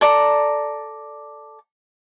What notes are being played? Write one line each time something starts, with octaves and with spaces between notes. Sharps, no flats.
A4 D5 A#5